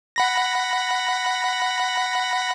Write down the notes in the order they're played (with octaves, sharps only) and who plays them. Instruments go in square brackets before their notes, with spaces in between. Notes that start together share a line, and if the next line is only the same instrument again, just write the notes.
[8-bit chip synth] F#5 B5 A#6